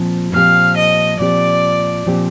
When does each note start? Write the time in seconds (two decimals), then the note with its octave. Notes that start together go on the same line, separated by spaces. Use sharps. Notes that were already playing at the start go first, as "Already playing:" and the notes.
Already playing: A#2 F3 C4
0.33 A#2 F3 C4 G4 F5
0.77 D#5
1.19 A#2 F3 C4 G4 D5
2.06 A#2 F3 C4 G4